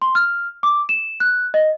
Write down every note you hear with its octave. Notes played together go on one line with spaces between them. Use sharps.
C6
F6
D6
E7
F#6
D#5